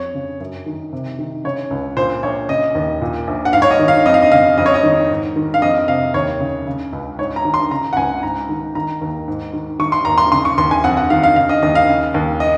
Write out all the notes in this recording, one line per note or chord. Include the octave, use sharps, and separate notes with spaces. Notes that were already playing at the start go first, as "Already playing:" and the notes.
Already playing: F2 C#5
C#3
F#2
D#3
C3
D#3
C#3 C#5
C#2
A#2 C5
A#1 C#5
C#3 D#5
D#2
A#2
A#1
F#5
G#2 F5
C#5
D#5
D#3
F5
F2 D#5
F5
D#5
C#3 F5
F2 D#5
C#5
D#5
D#3
G#2
D#3
F5
F2 D#5
C3 F5
D#2 C#5
C#3
C#3
C#2
G#2 C#5
A#5
D#3
C6
C#3 A#5
F#5
C#2 G#5
G#2 A#5
D#3
D#3 A#5
D#2
G#2
D#3
D#3 C#6
C6
D#2 A#5
C6
C#3 C6
C#6
D#2 C6
G#5
F2 F#5
F#5
D#3 F5
F5
C#3 F5
D#5
D#2 D#5
F5
C#3
D#2
D#5